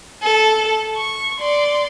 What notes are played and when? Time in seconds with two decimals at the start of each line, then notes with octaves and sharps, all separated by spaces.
0.23 A4
0.97 C#6
1.39 D5 C6